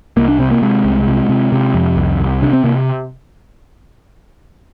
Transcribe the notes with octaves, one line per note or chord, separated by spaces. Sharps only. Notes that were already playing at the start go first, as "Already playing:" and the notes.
C2 A#3
D4
C3 C4
A#3
C3 G#3
C2
C3
C3
C3
F2
C2
C2
C3 D4
C4
C3 A#3